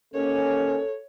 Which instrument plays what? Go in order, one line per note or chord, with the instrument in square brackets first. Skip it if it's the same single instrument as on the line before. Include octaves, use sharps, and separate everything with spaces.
[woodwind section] D#2 A#3 C#4 [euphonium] A4 [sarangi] C#5